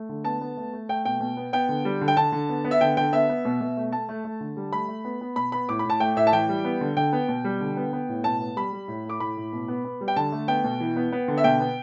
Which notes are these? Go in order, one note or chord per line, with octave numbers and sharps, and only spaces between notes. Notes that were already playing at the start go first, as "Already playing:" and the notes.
Already playing: A3
D3
B3 A5
B3
A3
A3
A3 G5
B2 G5
B2
B3
B3 G5
D3
G3
D3
G5
D3 A5
D3
B3
B3
E5
D3 G5
D3 G5
B3 E5
B3
B2
B2
A3
A3 A5
A3
A3
D3
G3
A3 B5
A3
B3
B3
B2 B5
B3 B5
A2 D6
B5
A2 A5
A3 G5
A2 E5
A5
E3 G5
G3
B3
D3
D3 G5
B3
B2
G3
D3
B3
B3
A2
B2 A5
B3
G3 B5
G3
A2
A3 D6
A2 B5
A2
B2
B3
B3
G3
G5
D3 A5
A3
B3 G5
B2
E3
B3
B3
D3
E5
B2 G5
B3